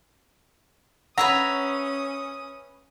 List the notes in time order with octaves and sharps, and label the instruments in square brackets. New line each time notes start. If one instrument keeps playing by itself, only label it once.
[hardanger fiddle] C#4 D#6 [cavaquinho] B4 C#5 E5 [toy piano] F#5 [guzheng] A#5